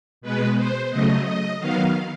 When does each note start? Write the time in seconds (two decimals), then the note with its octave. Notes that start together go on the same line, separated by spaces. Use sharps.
0.21 B2 G#3 B3 B4
0.56 C5
0.90 C#3 F#3 A3 D#5
1.25 D#5
1.60 D#3 F#3 B3 F5